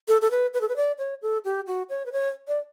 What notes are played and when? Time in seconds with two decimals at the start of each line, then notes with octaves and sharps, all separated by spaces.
0.08 A4
0.22 A4
0.31 B4
0.54 B4
0.61 A4
0.69 B4
0.76 D5
0.99 C#5
1.22 A4
1.45 G4
1.67 F#4
1.89 C#5
2.06 B4
2.12 C#5
2.48 D5